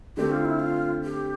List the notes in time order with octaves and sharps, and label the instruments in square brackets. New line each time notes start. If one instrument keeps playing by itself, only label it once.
[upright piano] D3 A3 C4 [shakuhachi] G4
[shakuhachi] F4
E4
F4
G4